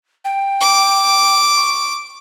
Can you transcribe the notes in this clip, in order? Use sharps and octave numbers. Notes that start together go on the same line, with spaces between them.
G5
D6
C#6